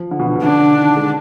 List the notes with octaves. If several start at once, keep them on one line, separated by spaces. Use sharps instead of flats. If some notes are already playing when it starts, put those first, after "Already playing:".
Already playing: F3
D3
B2
D3
B2
D3 D4
D#3
G#3